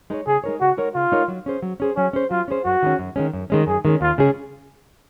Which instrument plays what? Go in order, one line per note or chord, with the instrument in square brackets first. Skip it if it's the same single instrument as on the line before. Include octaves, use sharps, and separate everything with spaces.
[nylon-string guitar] G#3 D#4 A#4 C#5
[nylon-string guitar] C#3 [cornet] G#4
[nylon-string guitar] G#3 D#4 A#4 C#5
[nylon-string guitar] C#3 [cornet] F#4
[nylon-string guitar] G#3 D#4 A#4 C#5
[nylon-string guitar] C#3 [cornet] F4
[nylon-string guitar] G#3 D#4 A#4 C#5
F#3
C#4 G#4 C5
F#3
C#4 G#4 C5
[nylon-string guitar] F#3 [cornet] C#4
[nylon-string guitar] C#4 G#4 C5
[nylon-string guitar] F#3 [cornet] F4
[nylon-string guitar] C#4 G#4 C5
[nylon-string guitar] F#2 [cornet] F#4
[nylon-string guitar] D#3 G#3 C#4
F#2
D#3 G#3 C#4
F#2
D#3 G#3 C#4
[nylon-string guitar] F#2 [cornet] G#4
[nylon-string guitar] D#3 G#3 C#4
[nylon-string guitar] D#2 [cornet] F4
[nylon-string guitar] C#3 G#3 C#4 G#4